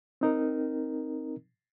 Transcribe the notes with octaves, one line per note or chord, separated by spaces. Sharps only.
C4 D#4 A#4